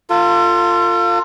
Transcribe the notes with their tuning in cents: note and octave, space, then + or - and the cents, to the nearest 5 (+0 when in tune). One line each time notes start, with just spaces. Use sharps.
F4 +0 A4 +40